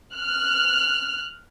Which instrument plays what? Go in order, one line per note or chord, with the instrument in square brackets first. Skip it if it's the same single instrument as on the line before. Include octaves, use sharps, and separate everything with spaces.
[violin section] F6 F#6